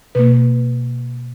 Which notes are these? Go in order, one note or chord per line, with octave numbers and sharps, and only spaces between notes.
B2 A#3 B4